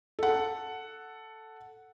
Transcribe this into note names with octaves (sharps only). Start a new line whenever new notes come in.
A4 F#5